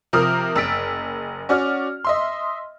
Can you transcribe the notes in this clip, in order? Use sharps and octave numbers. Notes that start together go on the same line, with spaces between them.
C3 F3 A#4 D#6 F6
F#1 E6 A6 B6 D7
C#4 F#4 D5 F6
D#5 E5 C6